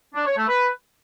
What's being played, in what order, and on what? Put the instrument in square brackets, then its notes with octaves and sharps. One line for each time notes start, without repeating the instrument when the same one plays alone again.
[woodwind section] D4
C#5
A3
B4